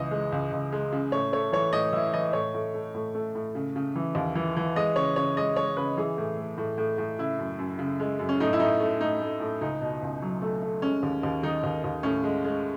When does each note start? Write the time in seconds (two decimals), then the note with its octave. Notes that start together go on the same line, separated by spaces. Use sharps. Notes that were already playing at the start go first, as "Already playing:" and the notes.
Already playing: C#2 E3 D#5
0.11 G#3
0.32 C#2
0.52 C#2
0.72 G#3
0.92 C#3
1.12 A2 C#5
1.33 A3 C#5
1.52 E3 C#5
1.73 A2 D#5
1.93 E3 E4
2.14 E3 D#5
2.33 A2 C#5
2.54 A2
2.74 A3
2.95 A2
3.15 A3
3.35 A2
3.55 C#3
3.76 C#3
3.96 E3
4.15 D#2
4.35 E3
4.57 E3
4.76 G#3 D#5
4.96 C#3 C#5
5.16 C#3 C#5
5.37 G#3 D#5
5.56 G#3 C#5
5.77 C#3 B4
5.97 E3 G#4
6.18 A2
6.37 A3
6.58 A2
6.78 A2
6.98 A2
7.19 C#3 E4
7.39 F#2
7.58 F#2
7.79 C#3
8.00 G#3
8.19 F#2
8.29 C#4
8.40 A2 D#4
8.53 E4
8.60 A2 D#4
8.80 A3
9.01 A2 D#4
9.21 A3
9.41 A2
9.61 C#2 D#4
9.81 B2
10.02 C#2
10.22 F#3
10.42 A3
10.62 A3
10.82 G#3 C#4
11.03 D#2
11.23 D#2
11.43 D#3 D#4
11.64 D#2
11.84 D#2
12.03 A2 C#4
12.24 G#3
12.45 G#3